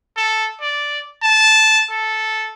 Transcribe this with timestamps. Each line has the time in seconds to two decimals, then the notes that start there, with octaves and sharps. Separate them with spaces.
0.17 A4
0.61 D5
1.22 A5
1.90 A4